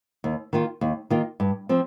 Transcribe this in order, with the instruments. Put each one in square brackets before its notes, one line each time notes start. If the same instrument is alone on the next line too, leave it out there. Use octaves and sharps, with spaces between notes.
[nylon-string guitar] D#2
D#3 A#3 F4
D#2
D#3 A#3 F4
G2
F3 C4